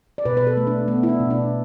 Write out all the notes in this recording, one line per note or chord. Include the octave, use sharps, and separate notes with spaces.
D5
B2 B4
B4
A4
A3
D4
A3 B3
E4
D4
B2
D4